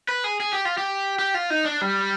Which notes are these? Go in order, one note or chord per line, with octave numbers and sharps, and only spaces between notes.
B4
G#4
G#4
G4
F4
G4
G4
F4
D#4
D4
G3